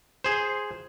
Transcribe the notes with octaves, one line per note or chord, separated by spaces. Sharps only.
G#4 C5